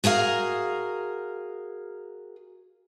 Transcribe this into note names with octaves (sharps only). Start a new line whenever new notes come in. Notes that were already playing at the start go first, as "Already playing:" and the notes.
F#4 G#4 A#4 F5